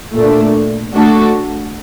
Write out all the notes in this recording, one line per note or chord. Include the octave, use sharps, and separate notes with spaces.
A#2 A3 D4
A3 D4 F#4 A4